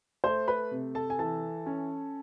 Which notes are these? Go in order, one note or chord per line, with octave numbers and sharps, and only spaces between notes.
A3 C5 C6
B4 B5
C3
A4 A5
G#5
E3 A4 A5
C#4